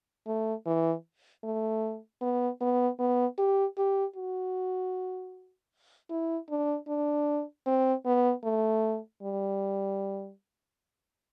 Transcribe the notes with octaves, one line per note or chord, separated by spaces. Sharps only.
A3
E3
A3
B3
B3
B3
G4
G4
F#4
E4
D4
D4
C4
B3
A3
G3